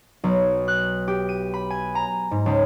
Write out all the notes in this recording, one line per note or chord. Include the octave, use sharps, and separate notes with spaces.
B1
F#6
G4
D#7
B5
G#5
A#5
G#2
C#2